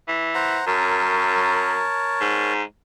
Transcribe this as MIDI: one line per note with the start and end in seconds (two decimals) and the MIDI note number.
0.08 0.59 52
0.35 0.65 72
0.35 0.65 78
0.35 0.65 82
0.67 1.82 42
0.67 2.53 70
0.67 2.53 73
0.67 2.53 81
2.21 2.62 44